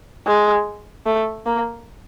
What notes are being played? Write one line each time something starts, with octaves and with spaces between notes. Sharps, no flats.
G#3
A3
A#3